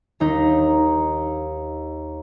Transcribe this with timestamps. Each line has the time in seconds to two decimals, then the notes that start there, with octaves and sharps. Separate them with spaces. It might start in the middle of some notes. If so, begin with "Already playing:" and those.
0.20 D#2 D#4